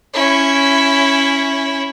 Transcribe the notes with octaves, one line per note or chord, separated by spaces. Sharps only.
C#4 E4